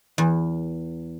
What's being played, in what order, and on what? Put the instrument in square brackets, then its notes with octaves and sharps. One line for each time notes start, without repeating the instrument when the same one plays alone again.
[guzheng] E2